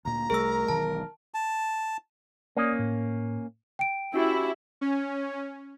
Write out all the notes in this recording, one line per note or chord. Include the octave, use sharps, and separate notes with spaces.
D2 A#2 A#5
C2 G3 A3 G#4 A#4 E6
E1 B1 D#3 A5
A5
A#3 C#4 D5 D#6
A2
G5 D7
C#4 E4 F#4 G4
C#4